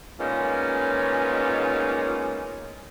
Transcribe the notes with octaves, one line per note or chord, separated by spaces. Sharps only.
A#2 G#3 B3 C#4 D#4 F4